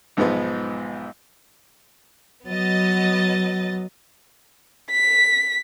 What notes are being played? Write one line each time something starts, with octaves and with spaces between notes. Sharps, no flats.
B1 G#2 F3 G#3 B3
F#3 B3 D#5 A6
B6